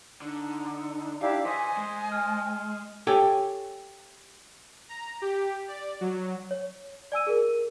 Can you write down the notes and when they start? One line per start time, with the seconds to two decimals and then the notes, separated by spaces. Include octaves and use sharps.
0.22 D3 D#4
1.22 D4 E4 G4 D5 F5
1.45 E3 C5 D#5 G#5 B6
1.77 G#3
2.12 F6
3.07 G4 A4 C#5 G5 G#5
4.89 A#5
5.22 G4
5.68 D5
6.01 F#3
6.51 C#5
7.12 D5 G#5 E6 D#7
7.27 G#4 A#4